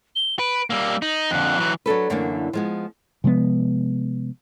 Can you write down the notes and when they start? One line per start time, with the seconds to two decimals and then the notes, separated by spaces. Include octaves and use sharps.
0.16 G7
0.39 B4 D7
0.70 G3 A#3 E6
1.02 D#4 F#7
1.31 F2 D3 F#6
1.58 E3 F#3
1.86 F#3 D4 A4 B4
2.10 F#2 D3 E3 A3 A#3 D4
2.53 F3 G#3 B3
3.24 C3 F3 G#3 B3